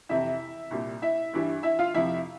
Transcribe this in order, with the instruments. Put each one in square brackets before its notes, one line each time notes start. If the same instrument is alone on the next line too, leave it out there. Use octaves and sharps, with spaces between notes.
[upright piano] F2 C3 E3 E4 E5
C2 A#2 G3
E4 E5
G2 E3 G3
E4 E5
F4 F5
F2 C3 F3 E4 E5